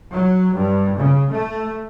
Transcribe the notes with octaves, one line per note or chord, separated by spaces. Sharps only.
F#3
G2
C#3
A3